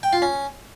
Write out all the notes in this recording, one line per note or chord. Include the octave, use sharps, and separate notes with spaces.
G5
F4
C#4